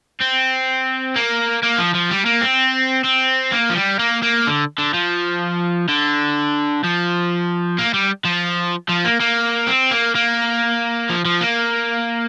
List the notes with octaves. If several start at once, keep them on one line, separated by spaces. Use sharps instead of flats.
C4
A#3
A#3
F3
F3
G3
A#3
C4
C4
A#3
F3
G3
A#3
A#3
D3
D3
F3
D3
F3
A#3
G3
F3
F3
A#3
A#3
C4
A#3
A#3
F3
F3
A#3